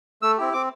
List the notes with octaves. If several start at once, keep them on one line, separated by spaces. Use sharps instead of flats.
A3 E6
C4 E4 G4
C4 D6